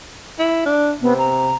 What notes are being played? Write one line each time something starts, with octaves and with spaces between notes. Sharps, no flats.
E4
D4
C3 B3
A#5